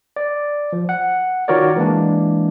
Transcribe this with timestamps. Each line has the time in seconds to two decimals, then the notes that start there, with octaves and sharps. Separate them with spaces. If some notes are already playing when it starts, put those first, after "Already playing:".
0.16 D5
0.73 F3
0.89 F#5
1.48 D#3 F4 F#4 A#4 C#5 D5
1.76 E3 G#3 A#3 D4